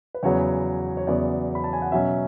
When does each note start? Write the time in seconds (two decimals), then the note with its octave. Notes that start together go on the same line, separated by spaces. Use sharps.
0.15 B4
0.23 E2 C#3 F#3 B3 C#5
0.97 C#5
1.07 E2 C#3 F#3 B3 D5
1.55 B5
1.64 A5
1.73 G#5
1.82 F#5
1.92 B2 F#3 C#4 E5